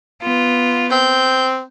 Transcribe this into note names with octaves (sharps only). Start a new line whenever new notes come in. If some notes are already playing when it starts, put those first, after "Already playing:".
B3 F4
C4 G6